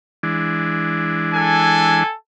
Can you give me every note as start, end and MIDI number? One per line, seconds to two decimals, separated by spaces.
0.23 2.04 52
0.23 2.04 56
0.23 2.04 62
1.35 2.14 69
1.35 2.14 80